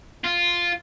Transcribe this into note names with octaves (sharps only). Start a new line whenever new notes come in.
F4